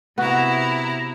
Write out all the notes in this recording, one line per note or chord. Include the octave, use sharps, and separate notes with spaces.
C3 B3 E4 F#4 A#5